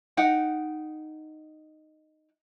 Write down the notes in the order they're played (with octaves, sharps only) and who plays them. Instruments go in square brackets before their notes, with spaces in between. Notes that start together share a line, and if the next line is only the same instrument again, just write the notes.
[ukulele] D#4 F#5 G5